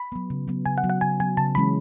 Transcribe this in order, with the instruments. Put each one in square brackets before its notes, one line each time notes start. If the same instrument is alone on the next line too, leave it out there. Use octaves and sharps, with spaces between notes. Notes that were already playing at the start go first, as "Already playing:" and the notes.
Already playing: [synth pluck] B5
[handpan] F#3 B3
C#3
F#3 B3
[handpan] C#3 [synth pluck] G#5
[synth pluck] F#5
[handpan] F#3 B3
[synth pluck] F#5
[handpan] C#3 [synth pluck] G#5
[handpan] F#3 B3 [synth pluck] G#5
[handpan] C#3 [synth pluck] A5
[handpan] E3 G#3 C#4 [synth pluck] B5